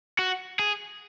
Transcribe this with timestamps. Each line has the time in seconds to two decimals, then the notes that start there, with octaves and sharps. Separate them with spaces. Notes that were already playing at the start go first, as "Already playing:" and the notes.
0.19 F#4
0.59 G#4